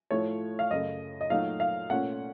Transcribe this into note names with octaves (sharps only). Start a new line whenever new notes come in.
A2 F3 A3 C#5
F5
F#2 C#3 A3 D#5
D#5
A#2 F#3 A3 D#4 F5
F5
A#2 A3 C#4 F#5